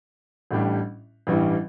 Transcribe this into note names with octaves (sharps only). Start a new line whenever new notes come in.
A1 A2 G3 D4 G4
A1 G2 E3 G3 E4